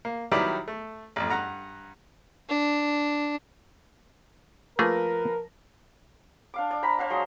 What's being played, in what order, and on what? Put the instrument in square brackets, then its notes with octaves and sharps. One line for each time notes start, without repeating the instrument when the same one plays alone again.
[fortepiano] A#3
D#3 F#3 G3 E4 B4 D5
A3
A1 F2
G2 F#5 A#5
[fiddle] D4
[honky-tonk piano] F3 B4 A#6 [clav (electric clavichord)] A3 A#3 G#4 [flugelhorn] A#4
[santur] D4 F5 D6
D5
C5 A#5 B5
C5 F5 F#5 A#5
F#3 G#3 C6 D#6